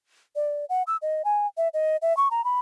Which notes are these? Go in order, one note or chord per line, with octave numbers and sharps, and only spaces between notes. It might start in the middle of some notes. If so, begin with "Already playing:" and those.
D5
F#5
E6
D#5
G#5
E5
D#5
E5
C#6
A#5
B5